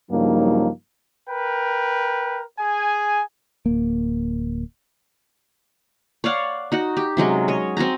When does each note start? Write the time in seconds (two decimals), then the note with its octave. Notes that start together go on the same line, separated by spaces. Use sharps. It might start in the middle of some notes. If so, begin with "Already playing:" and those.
0.11 G2 C#3 F3 F#3 A#3 D#4
1.28 A#4 B4 G5
2.58 G#4 G#5
3.66 D1 A#3
6.24 C#5 D5 F5 F#5
6.72 D#4 F#4 F#5
6.97 G4
7.17 C3 F#3 G#3 C#4
7.48 C#5 D#5
7.77 C4 F#4 G#5 A#5